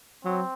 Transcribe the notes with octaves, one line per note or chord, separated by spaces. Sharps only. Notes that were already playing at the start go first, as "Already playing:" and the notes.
F#3 C4